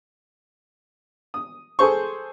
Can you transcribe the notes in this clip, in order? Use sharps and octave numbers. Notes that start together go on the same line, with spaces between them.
D#6
G#4 A4 C5 C#6